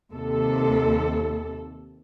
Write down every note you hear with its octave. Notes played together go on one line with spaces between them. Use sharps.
D#2 C3 A4